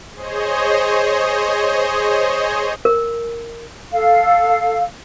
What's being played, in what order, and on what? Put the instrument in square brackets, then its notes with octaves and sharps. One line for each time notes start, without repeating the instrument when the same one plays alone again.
[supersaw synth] G#4 C5 C#5 D#5
[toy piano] A#4
[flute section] A4 F5